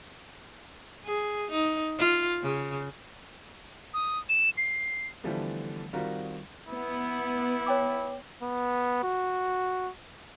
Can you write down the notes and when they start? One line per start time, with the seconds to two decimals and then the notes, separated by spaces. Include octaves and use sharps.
1.04 G#4
1.51 D#4
1.99 F4
2.43 C#3
3.94 D#6
4.29 E7
4.58 C7
5.24 D3 E3 F3 G3 A3 B3
5.93 D#3 G3 C4 F4 F#4 A#4
6.68 B3 E4
7.66 C#5 G5 D6
8.42 B3
9.03 F#4